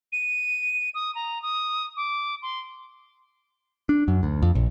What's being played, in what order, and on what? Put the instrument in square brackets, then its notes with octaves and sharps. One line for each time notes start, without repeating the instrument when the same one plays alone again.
[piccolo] D#7
D#6
A#5
D#6
D6
C6
[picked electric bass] D4
F#2
D2
F2
A#1